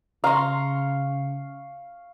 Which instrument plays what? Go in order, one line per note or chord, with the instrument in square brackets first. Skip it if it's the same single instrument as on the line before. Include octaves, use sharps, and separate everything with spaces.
[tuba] C#3 [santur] F5 C#6 [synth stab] A#5 C6